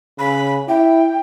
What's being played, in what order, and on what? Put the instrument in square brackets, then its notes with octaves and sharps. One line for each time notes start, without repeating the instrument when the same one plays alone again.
[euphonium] C#3 [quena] B5
[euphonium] E4 [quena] G5